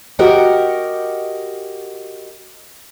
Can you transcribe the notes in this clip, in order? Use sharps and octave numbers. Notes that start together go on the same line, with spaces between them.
F#4 G4 A#4 D#5 F#5 G5